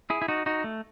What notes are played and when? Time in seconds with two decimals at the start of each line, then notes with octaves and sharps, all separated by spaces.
0.10 E4 G#4
0.22 E4
0.28 D#4 F#4
0.46 D#4 F#4
0.64 A3